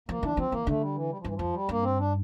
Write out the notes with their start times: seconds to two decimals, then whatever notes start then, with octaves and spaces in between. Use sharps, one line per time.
0.09 F3 A#3
0.23 E3 D4
0.37 F3 C4
0.51 E3 A#3
0.67 D3 A3
0.81 G3
0.95 E3
1.10 G3
1.19 F3
1.24 G2 E3
1.34 F2 F3
1.53 G3
1.69 G2 A#3
1.83 C4
1.98 D4